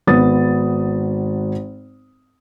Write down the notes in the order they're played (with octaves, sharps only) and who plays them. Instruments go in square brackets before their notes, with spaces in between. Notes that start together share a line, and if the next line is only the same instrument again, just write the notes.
[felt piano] G#1 B3 D#6 A6